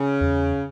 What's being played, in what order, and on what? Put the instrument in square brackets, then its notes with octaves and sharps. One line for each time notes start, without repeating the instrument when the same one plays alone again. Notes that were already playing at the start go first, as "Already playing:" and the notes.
Already playing: [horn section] C#3
[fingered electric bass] E2